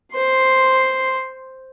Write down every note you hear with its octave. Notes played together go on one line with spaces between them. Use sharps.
C5 C6